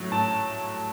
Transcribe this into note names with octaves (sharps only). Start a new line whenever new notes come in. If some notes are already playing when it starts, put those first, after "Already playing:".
Already playing: A2 F#3
A2 A5